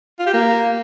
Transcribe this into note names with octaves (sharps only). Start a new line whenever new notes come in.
F4
G4
A#3